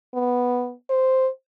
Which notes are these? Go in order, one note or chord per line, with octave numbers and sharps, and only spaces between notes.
B3
C5